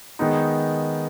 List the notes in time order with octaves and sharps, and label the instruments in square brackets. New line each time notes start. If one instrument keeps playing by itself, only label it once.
[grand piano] D#3 G#3 B3 D#4